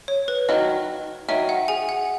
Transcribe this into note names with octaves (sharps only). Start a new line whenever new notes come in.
C#5
B4
D#3 F#3 D#5
D#3 F#3 E5
F#5
G#4 G#5
F#5